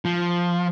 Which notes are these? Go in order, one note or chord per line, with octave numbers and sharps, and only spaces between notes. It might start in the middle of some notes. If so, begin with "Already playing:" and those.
F3